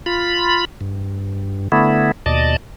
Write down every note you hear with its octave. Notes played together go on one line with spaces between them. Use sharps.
F4 B5
G2
D3 A3 B3 E4
D#2 B2 D5 D#5 A5